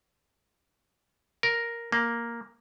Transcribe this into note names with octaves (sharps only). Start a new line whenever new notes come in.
A#4
A#3